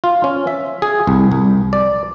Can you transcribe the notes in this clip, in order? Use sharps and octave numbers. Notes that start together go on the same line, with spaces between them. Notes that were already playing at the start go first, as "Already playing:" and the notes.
F4
C#4
E5
G#4
C2
C2
D5